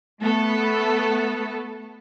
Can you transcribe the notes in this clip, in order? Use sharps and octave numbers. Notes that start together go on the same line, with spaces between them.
A3 B3 A4